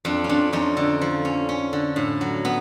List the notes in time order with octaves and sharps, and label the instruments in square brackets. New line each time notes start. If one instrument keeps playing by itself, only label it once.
[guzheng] F2 D4
C#4
F2 D4
F2 C#4 D#4
D3
F3
C#4
C#4
D3
A2
F#3
B3